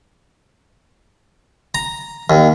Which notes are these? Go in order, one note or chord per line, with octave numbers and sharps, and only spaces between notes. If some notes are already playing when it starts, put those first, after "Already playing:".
A#5
D#2